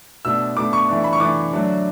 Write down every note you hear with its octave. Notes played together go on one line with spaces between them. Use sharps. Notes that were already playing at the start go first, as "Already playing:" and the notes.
B2 A3 D4 E6
B2 A3 D4 D6
C#6
E3 A3 D4
B5
C#6
E3 A3 D4 D6
D3 F#3 A3 D4